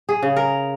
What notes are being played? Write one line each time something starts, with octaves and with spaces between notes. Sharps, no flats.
G#4
C#3
A#4